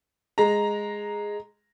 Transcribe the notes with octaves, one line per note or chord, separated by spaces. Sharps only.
G#3 A#5